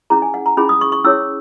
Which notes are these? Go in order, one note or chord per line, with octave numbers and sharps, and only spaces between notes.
C#4 E4 G#4 A#5
G#5
F#5
A#5
C#4 E4 G#4 B5
D#6
C#6
C#6
C#4 E4 G#4 C#5 E6